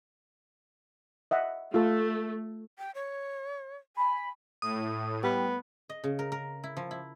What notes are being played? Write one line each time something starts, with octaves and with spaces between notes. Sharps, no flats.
D#5 E5 F#5
A3 F4 A4
G5
C#5
G#5 B5
A2 D#6
G3 B3
D#5
C#3
A#4
A#4
E4
F3
E4